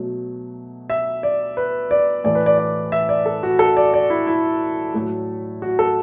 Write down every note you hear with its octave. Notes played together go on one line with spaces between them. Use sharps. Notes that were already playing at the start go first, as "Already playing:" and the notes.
Already playing: B2 F#3 A3
E5
D5
B4
D5
A2 E3 A3 D5
B4
D5
D5
E5
D5
A4
F#4
A4
D5
D5
E4
E4
A2 F#3 A3
F#4
A4